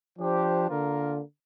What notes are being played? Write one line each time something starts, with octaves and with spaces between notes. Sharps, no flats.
F3 D4 G4 C5
D3 A#3 F4 A#4